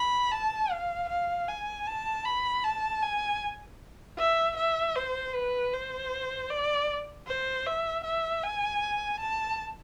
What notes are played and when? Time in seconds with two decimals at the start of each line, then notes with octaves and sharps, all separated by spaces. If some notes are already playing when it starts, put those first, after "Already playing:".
Already playing: B5
0.32 A5
0.71 F5
1.09 F5
1.48 G#5
1.87 A5
2.25 B5
2.64 A5
3.03 G#5
4.18 E5
4.57 E5
4.96 C5
5.35 B4
5.73 C5
6.50 D5
7.27 C5
7.66 E5
8.04 E5
8.43 G#5
9.20 A5